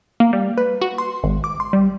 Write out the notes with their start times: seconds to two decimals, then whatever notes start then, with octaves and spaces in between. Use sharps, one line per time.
0.20 A#3
0.33 G3
0.58 B4
0.82 F#4
0.98 C6
1.23 G#1
1.44 D6
1.60 C6
1.73 G3